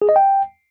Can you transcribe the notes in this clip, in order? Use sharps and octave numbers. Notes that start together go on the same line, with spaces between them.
G#4
D#5
G5